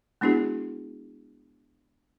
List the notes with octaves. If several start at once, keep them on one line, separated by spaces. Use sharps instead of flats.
G#3 B3 D4 E4 F#4 G#4